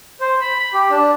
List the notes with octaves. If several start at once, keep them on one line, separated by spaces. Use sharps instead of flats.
C5
B5
B5
G4
D4